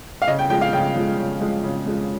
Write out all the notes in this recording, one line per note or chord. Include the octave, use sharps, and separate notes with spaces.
F5
C#3 D#5
G5
F3 G#3 G5
F5
C#3 G5
F3 G#3
C#3
F3 G#3
C#3
F3 G#3